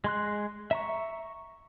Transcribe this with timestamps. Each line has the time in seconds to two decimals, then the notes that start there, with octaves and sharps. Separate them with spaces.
0.04 G#3 C6 F#6
0.71 E5 A#5 C#6